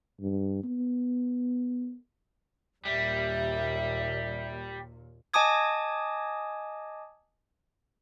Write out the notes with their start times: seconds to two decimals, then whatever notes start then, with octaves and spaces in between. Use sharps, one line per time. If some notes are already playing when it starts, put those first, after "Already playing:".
0.20 G2
0.64 B3
2.85 D#2 A#2 G3 E5
5.34 D#5 G#5 A5 D6 D#6 G#6